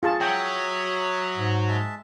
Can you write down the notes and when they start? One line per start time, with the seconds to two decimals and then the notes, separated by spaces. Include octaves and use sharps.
0.03 F4 G#4 A5 C#6
0.21 F#3 C#5 E5 G5 D#6
1.37 G#2
1.68 G#3 E5 A5